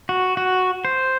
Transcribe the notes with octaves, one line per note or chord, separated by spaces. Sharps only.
F#4
F#4
C5